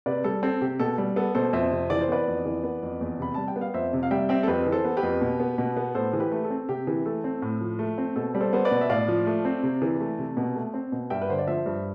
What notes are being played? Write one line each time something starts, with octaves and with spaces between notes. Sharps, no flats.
C3 B4 D5
G3 A4
C4 A4
C3 G4
B2 A4
G3
B3 A4
B2 A4 C5
F2 C5 E5
C3
E3 D5
C5
B3 B4 D5
F2
E3
B3
F2
E2
C3 B5
G3 A5
G5
B3
F5
F2 C5 E5
C3
F5
G3 E5 G5
C4 E5 G5
A4
F2 G4 B4
E3
A4 C5
B3
G4 B4
F2
B2
B3
B2
B3
A2 A4 C5
E3
G4 B4
A3
A4
C4
C3 G4
E3
A3 A4
C4
A2
F3
A3
C4
B2 A4
G3
A4 C5
B3 C5
B4 D5
B2
E5
A2 D5 F5
F3
A3
C4
C3
E3
A3
C3
B2
A3
C4
B2
G2 E5 G5
B4
D3 C5
D5
F3 C5 E5
G2